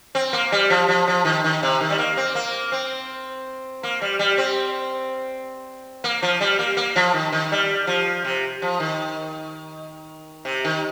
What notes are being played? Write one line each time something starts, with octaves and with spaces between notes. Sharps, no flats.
C4
A#3
G3
F3
F3
F3
D#3
D#3
C3
D#3
G3
A#3
C4
A#3
C4
A#3
G3
G3
C4
A#3
F3
G3
A#3
A#3
F3
D#3
D#3
G3
F3
C3
F3
D#3
C3
D#3